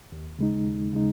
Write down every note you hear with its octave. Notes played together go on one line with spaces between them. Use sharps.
D#2
C#3 G#3 D#4
D#2
C#3 G#3 D#4